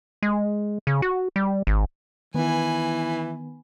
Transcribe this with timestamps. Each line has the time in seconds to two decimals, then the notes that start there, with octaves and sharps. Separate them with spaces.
0.23 G#3
0.87 C#3
1.02 F#4
1.36 G3
1.67 G#1
2.34 D#3 E3 B3 G#5 B5